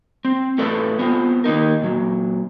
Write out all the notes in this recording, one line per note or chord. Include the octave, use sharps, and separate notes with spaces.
C4
A2 A3 A4 B4 D5
B3 C4 F4
D#3 A#3 D#4 A#4
A#2 F#3